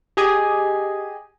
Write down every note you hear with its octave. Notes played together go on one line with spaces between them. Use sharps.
G4 G#4 D#5 G#5